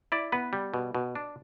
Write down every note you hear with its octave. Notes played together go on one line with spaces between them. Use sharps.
E4 D5
B3 B4
G3
B2
B2
D4